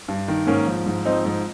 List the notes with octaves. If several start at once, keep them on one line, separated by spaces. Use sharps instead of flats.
G2
D#3
G#2 A#3 C#4
F3
G#2
F3 C4 D#4
G#2